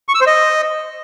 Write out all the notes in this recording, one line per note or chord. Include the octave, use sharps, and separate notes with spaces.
C#6
E6
C5
D#5